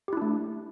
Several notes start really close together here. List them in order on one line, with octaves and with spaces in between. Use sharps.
G4 E4 D4 A3